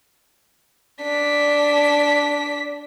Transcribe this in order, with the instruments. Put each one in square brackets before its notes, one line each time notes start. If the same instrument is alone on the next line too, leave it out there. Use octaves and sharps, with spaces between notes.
[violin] D4 B6